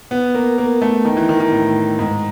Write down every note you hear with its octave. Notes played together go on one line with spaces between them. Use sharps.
B3
A#3
A#3
A3
D#3
E3
D#3
D#3
A2
G#2